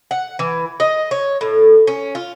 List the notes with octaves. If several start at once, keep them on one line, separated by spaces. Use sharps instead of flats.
F#5
E3
D#5
C#5
A2
C#4
F4